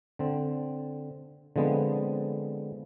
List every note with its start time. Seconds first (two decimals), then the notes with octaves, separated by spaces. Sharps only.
0.19 D3 C4
1.56 D3 F3 G#3 B3 C4